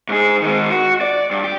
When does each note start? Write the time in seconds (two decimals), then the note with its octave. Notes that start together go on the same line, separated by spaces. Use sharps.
0.09 G#2 G#4
0.42 D#3 G#3
0.70 F#4
1.01 D5
1.31 G2
1.44 G4